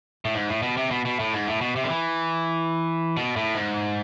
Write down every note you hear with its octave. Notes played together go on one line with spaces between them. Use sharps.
A2
G#2
A2
B2
C3
B2
B2
A2
G#2
A2
B2
C3
D3
E3
B2
A2
G#2